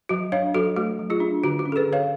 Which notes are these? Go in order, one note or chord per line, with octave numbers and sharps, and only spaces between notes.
F#3 F#4
D4 C#5 F5
F#3 F#4 A4
A3 F#4
F#3
F4 G#4
D4
D3 F#4
F#4
C#4
A4
G#4 B4
D3 C#5 F5